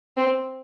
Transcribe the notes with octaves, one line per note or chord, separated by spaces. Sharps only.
C4